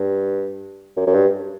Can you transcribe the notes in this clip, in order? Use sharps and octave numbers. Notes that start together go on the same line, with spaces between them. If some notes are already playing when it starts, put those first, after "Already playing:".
Already playing: G2
F#2
F#2
G2